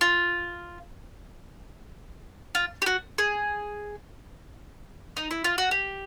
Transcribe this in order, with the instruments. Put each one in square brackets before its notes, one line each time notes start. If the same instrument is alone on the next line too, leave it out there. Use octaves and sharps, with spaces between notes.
[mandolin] F4
F4
G4
F#4
G#4
D#4
E4
F4
F#4
G4